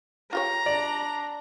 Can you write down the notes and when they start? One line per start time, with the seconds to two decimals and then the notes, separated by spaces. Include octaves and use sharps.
0.33 F4 G4 C#5 A#5
0.66 D4 D5